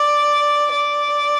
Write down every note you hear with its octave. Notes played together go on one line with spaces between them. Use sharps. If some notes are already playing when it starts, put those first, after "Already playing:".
Already playing: D5
D5